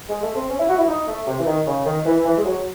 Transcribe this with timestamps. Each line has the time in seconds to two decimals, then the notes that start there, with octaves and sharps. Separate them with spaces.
0.09 G#3
0.23 A3
0.36 C4
0.50 C#4
0.60 E4
0.68 F#4
0.79 E4
0.88 D#4
1.08 A3
1.27 C3
1.39 E3
1.46 D#3
1.67 C#3
1.86 D#3
2.06 E3
2.25 E3
2.38 G#3
2.45 F#3